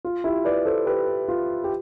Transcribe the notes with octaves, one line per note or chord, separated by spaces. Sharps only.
F4
E4 G4
B4 D5
A4 C5
G4 B4
F4
G4